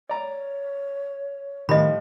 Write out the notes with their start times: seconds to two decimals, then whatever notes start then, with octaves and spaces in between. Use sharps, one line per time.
0.09 C#5 D5 A#5
1.69 A2 D#3 F3 G3 D#5 B5